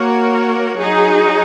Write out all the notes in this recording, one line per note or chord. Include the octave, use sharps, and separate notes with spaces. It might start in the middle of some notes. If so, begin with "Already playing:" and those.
Already playing: A#3 F#4 A#4 C#5
F#3 D#4 G#4